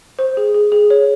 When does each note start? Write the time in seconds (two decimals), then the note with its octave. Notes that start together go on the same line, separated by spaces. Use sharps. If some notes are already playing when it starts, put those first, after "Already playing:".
0.19 C5
0.37 G#4
0.54 G#4
0.72 G#4
0.90 C#5